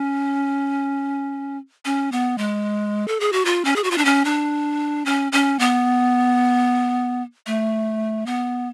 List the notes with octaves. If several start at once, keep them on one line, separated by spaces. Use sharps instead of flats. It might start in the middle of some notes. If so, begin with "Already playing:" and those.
Already playing: C#4
C#4
B3
G#3
A4
G#4
F#4
F4
C#4
G#4
F#4
F4
D4
C#4
D4
C#4
C#4
B3
A3
B3